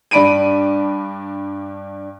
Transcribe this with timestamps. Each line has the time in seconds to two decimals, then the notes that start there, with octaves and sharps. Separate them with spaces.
0.11 G2 D4 B5 D7 D#7